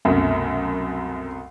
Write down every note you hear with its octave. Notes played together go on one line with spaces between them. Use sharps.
C2 F#2 B2 A3